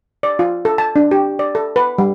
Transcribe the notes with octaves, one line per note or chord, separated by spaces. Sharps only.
D5
F4
A4
A5
D4
G4
D5
A4
B4
G3